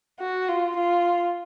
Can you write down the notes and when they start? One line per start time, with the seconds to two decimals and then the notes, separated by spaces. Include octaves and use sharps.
0.20 F#4
0.49 F4
0.76 F4